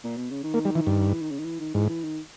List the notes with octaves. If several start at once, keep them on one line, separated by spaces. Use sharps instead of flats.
A#2
B2
C#3
D#3
A#3
G3
E3
G2
E3
D#3
C#3
D#3
E3
D#3
G#2 E3
E3
D#3